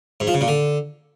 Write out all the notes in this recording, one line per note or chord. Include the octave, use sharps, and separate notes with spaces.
G#2
F3
C#3
A#2
D3